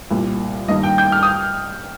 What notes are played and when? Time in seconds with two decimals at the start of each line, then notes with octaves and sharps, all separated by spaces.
0.11 C2 A#2 A#3
0.68 G2 D#3 A#3 D#5
0.83 G5
0.98 G6
1.12 F6
1.23 D#6